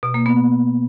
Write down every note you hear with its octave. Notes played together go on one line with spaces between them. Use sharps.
B2
A#3
B3